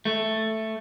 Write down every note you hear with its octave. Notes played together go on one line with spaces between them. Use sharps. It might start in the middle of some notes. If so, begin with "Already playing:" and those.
A3